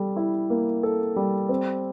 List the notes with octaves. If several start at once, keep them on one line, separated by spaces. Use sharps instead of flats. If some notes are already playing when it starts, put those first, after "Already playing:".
Already playing: G3 A4
E4
A#3
A4
G3
C4